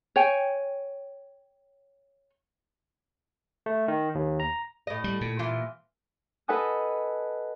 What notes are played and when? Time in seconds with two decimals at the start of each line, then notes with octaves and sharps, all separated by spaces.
0.16 C#5 G5 G#5
3.66 A3
3.88 D#3
4.15 D#2
4.40 A#5
4.87 A2 D#5
5.04 G3
5.21 A#2
5.39 E3 F4
6.48 A4 B4 D#5 F#5 G#5 D#6